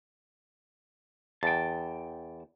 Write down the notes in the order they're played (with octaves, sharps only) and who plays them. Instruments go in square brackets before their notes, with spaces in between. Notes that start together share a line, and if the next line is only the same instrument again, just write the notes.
[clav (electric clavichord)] E2 [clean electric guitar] G5 A5